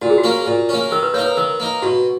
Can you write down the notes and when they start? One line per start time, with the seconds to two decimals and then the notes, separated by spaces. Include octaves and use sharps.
0.02 A#2 F#4
0.10 G#4
0.18 F#4
0.24 A#3 C#4
0.46 A#2
0.69 A#3 C#4
0.91 D#3 A#4
1.03 B4
1.14 A#3 D#4 C#5
1.26 B4
1.37 D#3 A#4
1.60 A#3 D#4
1.82 B2 F#4